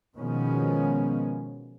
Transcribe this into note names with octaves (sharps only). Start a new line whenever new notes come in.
B2 D#3 F3 G#3 B3 C#4